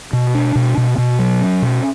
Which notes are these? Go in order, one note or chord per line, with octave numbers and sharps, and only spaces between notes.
B2
D4
B2
B2
B2
F#3
C#4
B2